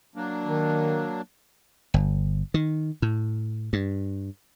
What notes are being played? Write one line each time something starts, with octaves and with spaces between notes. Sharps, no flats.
F#3 A#3 D4
D#3
G1
D#3
A2
G2